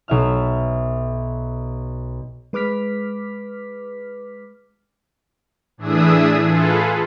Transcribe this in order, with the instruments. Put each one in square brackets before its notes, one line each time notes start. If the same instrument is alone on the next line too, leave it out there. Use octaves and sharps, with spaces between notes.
[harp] B1 E5 F6
[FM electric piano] G#3 B4 D6 F6 B6
[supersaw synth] A2 E3 D4 G#4 E5 D#6
F4 G#4 A4 B4